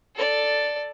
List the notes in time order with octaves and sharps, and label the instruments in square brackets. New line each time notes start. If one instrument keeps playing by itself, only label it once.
[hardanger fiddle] A4 D5